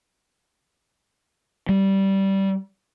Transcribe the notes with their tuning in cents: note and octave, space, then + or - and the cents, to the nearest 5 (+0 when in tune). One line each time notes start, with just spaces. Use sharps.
G3 -15